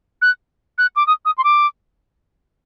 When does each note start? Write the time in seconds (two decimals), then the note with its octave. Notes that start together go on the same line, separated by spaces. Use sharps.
0.22 F#6
0.78 F#6
0.96 D6
1.07 D#6
1.25 D#6
1.38 C6
1.44 D6